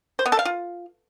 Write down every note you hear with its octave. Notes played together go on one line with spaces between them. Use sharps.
C5
B3
A4
F5
F4